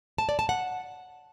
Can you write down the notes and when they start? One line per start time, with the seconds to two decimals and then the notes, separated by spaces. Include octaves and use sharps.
0.18 A5
0.29 D5
0.39 A5
0.49 F#5